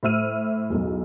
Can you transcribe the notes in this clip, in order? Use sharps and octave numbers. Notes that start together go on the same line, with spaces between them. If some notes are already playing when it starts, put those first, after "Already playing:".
A2 C5 E5 E6 F6 D#7
B1 E2